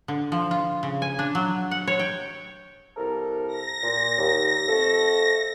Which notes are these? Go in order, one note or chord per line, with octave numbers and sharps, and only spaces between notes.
D3
F3
F4
C#3
G#5
D4
F#3
F#5
C#5
G5
C2 A4 A#4
A#6
A#2
D#2
F2 A3 A4